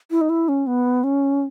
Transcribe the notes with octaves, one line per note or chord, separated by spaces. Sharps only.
E4
D#4
E4
C#4
B3
C#4